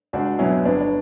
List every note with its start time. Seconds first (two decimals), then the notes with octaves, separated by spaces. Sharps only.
0.13 C#2 D4 F#4
0.39 B2 F#3 C#4 E4
0.65 G1 B3 D4
0.80 D4